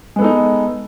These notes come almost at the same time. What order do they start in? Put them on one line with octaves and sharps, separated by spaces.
G#3 B3 A4 D#4